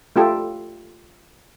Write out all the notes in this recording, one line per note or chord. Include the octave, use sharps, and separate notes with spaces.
A3 F4 G4 A4